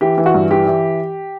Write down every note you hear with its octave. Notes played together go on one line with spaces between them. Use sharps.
E3 G4
E3
F#4
G2
E3 G4
E3